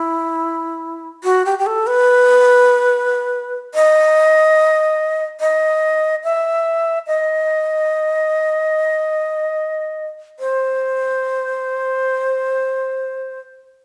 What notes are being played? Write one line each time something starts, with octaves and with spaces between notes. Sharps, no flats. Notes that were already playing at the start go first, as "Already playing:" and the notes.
Already playing: E4
F#4
G4
G4
A4
B4
D#5
D#5
E5
D#5
C5